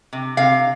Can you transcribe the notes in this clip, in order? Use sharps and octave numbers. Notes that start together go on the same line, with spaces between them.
C3
C3 F5